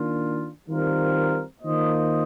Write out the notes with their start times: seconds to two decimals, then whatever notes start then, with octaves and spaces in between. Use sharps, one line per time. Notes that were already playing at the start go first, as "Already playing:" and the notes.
Already playing: D#3 A#3 D4 F4
0.68 D#3 G3 C4 F4 A#4
1.61 D#3 A#3 F4 C5 D#5